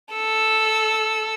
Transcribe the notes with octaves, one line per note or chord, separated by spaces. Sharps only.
A4 E6